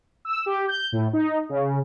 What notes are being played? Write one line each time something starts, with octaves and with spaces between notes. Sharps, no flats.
E6
G4
G6
A2
D#4
C#3